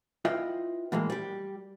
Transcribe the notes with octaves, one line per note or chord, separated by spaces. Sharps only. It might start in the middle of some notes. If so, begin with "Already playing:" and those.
E4 F4 B4 D#5 G5
A2 E3 G#3 A#3
G3 G4